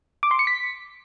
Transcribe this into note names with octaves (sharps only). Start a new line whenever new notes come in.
D6
C6
C#7
B6